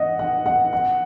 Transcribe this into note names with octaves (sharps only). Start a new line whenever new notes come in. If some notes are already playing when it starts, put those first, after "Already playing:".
Already playing: D#5 F#5
F#5
F#5
F#5